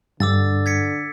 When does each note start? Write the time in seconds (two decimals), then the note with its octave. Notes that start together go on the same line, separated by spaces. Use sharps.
0.20 G2 D3 D6 E6 A6
0.66 G#6 B6 C#7